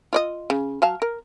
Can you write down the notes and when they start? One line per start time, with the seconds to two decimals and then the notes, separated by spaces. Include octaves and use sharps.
0.13 F4 D5 D#5
0.50 C#3
0.82 F#3 F5 A5
1.02 A#4